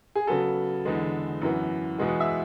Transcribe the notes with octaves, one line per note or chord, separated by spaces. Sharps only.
G#4
C#3 F#3 B3 A4
E2 D3 G#3 B3
F#2 E3 B3
E2 B2 G#3 B3
F#5
E5